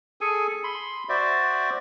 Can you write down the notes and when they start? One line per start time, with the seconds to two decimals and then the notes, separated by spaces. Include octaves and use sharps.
0.21 G#4 A4 G#5
0.64 B5 C6
1.09 F#4 C5 D5 E5